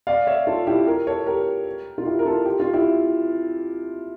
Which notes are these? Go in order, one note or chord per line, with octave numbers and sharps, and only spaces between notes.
D5 F5
C#5 E5
F4 A4
E4 G4
G4 A#4
A4 C#5
G4 A#4
F4
E4 G4
A#4
F4 A4
G4
F4
E4 G4